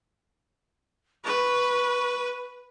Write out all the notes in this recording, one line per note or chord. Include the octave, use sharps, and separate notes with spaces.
B4 C#6